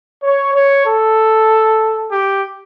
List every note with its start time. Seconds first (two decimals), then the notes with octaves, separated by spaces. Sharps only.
0.23 C#5
0.54 C#5
0.85 A4
2.09 G4